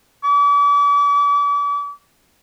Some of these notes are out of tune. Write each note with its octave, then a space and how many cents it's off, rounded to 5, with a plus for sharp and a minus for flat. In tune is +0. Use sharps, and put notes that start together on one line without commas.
D6 -40